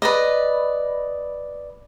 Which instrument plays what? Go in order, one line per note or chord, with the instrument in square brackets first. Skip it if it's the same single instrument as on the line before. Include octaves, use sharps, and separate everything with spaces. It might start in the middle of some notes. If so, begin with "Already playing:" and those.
[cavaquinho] B4 D5 D#5